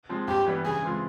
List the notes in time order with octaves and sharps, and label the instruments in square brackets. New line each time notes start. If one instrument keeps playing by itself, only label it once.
[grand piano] F3 G#3 C4
[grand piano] G2 [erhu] G4
[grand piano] E3 G3 B3 D4
[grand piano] C#3 [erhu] G#4
[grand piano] E3 G#3 C4 F4